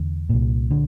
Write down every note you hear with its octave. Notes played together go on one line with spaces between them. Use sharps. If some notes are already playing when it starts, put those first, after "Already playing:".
Already playing: E2 D3
C2 A#2
D3